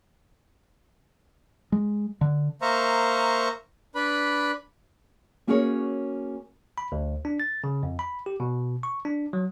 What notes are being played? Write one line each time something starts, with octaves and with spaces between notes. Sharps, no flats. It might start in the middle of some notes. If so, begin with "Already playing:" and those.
G#3
D3
A#3 C5 E5 F5 A#5 C#6
D4 B4 B5
A#3 C#4 F#4 G#4 A#4 C#5
B5
D2
D4
A6
C#3
F2
B5
G4
B2
C#6
D4
F#3